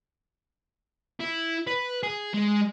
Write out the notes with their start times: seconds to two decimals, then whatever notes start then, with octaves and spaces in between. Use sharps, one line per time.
1.20 E4
1.67 B4
2.03 G#4
2.34 G#3